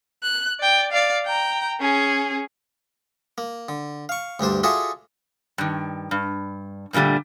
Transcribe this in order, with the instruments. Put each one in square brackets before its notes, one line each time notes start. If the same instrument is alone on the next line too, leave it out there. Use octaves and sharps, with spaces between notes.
[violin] F#6
D5 G5
D5 F5
G5 A#5
C#4 G#4
[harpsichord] A#3
D3
F5 C#6
D2 G2 D4 C5
F4 F#4 G#4 A4 D5 E5
[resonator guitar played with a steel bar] G2 D#3
G2
G2 A#2 D3 G3 A3